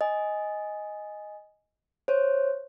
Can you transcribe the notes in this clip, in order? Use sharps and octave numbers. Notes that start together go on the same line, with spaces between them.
D#5 G#5
C5 C#5